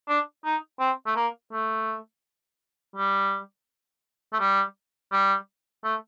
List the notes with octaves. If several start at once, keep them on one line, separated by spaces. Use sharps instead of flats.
D4
D#4
C4
A3
A#3
A3
G3
A3
G3
G3
A3